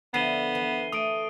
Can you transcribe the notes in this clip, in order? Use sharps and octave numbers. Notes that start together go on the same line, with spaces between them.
D3 F3 B3 E4 C7 D#7 G7
E3
A3 D#6 D7 D#7